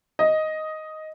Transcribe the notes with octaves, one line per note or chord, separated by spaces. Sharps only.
D#5